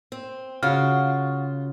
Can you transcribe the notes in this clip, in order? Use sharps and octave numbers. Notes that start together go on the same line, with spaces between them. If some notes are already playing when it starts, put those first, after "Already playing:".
C4
C#3 F4 F#4 F6